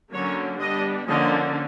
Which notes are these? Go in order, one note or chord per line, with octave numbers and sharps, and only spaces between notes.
D3 F#3 A#3 C#4 C#5
G3 B3 D4 D#5
D3 F3 A#3 C#4 D#5